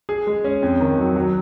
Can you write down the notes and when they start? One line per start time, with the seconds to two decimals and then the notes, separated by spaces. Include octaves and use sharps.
0.09 G#4
0.27 G#3
0.44 C#4
0.62 F2
0.80 D#3
0.98 F#3
1.16 F#3